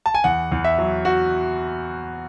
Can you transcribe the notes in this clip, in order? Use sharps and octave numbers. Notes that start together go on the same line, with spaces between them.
A5
G#5
E2 F#5
E2
E5
F#3
F#4